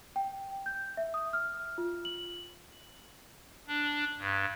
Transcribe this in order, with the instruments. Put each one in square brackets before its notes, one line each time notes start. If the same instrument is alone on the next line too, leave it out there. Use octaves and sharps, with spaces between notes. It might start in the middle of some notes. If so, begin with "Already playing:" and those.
[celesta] G5
G6
E5
D#6
F6
F4
F#7
[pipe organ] D4
G2